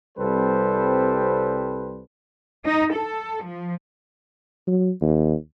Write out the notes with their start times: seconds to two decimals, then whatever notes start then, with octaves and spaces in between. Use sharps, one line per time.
0.18 C2 G3 C4 A4 B4 C5
2.66 D#4
2.94 A4
3.44 F3
4.67 F#3
5.01 D#2